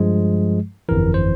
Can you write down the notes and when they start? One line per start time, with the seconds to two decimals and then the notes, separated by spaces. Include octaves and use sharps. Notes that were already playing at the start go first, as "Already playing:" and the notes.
Already playing: G2 F3 G#3
0.89 G1 F2 E3 A#4
1.14 C5